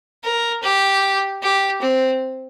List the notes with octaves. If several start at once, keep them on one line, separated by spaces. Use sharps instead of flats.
A#4
G4
G4
C4